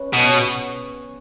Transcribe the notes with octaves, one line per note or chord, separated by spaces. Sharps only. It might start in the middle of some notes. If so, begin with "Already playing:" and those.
Already playing: C#4 B4
B2 B3 G#4 C#5